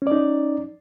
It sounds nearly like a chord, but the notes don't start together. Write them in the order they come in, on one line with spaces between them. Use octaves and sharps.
C#4 D5 D#4